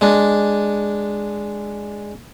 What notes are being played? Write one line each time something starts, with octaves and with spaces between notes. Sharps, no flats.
G#3 D4